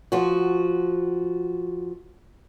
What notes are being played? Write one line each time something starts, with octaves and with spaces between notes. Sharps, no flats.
F3 F#4